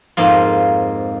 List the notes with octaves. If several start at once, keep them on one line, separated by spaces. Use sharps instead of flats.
F2 G#2 A#3 F4